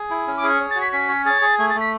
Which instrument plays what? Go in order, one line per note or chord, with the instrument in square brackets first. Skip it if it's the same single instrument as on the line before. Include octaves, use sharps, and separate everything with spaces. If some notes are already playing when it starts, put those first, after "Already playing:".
Already playing: [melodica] G#4
E4
C#4
[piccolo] D6
[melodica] G#4
[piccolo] C#6
[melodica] C#5
[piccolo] A6
[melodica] F#4
[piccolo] B6
[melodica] C#4 [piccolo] B6
[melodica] C#5
[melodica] G#4 [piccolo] A6
[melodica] G#4
[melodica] A3 [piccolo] G#6
[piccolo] A6
[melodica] A3
[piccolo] B6